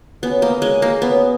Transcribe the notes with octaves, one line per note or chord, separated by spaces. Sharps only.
F#3 B3 C#4 G#4
A#3
G#3
A#3
F#3 B3 C#4 G#4